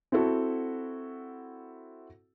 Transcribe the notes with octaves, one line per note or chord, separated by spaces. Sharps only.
C4 E4 F#4 A4